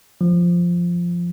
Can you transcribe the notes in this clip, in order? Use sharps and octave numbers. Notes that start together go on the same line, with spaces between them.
F3